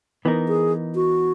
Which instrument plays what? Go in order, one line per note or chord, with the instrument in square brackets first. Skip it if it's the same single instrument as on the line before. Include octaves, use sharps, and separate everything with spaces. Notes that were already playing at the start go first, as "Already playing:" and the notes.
[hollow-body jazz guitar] E3 B3 D#4 A#4
[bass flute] G#4
F#4